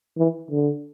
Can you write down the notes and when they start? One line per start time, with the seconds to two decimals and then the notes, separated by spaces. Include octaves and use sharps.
0.18 E3
0.51 D3